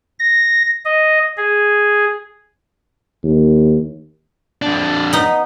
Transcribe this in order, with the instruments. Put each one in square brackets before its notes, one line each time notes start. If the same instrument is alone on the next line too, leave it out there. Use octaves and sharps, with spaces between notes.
[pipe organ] A#6
D#5
G#4
[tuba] D#2
[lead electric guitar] F2 D4
[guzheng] B3 D#4